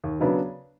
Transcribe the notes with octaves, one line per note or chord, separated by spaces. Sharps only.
D#2
C#3 F#3 B3 D4